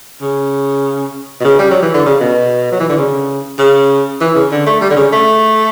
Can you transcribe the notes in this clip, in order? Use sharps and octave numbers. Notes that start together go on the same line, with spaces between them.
C#3
B2
C#3
G3
F#3
E3
D3
C#3
B2
F#3
E3
D3
C#3
C#3
E3
C#3
D3
A3
G3
D3
C#3
A3